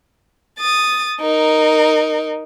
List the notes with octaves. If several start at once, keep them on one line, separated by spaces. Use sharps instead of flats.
D#6 A6
D#4 A#4